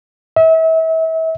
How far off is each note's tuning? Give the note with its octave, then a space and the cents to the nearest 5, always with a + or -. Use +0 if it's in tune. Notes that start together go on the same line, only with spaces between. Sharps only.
E5 -35